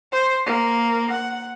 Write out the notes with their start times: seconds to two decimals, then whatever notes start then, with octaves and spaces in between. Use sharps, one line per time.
0.12 C5
0.46 A#3
1.11 F#5